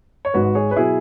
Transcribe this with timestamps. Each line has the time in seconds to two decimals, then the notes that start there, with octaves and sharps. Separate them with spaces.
0.25 C#5
0.34 G#1 G#2 G#3 F#4 B4
0.55 G#4 C#5
0.71 B4
0.76 B2 F#3 E4 G#4